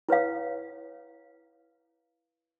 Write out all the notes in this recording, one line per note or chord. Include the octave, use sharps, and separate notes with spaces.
E4 B4 C#5 F5